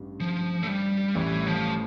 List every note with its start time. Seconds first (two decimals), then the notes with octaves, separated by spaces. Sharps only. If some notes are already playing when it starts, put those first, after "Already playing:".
Already playing: A1 G2
0.20 F3
0.63 A3
0.68 G3
1.15 A1 A2 E3 G3
1.47 F3